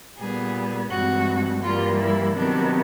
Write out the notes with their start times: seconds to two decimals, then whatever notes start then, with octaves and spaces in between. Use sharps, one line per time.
0.19 A#2 G3 B3 G#4
0.91 G2 E3 G#3 C4 F#4
1.63 G2 E3 G3 A#3 F4
2.00 E4
2.35 C3 D#3 F#3 B3 D4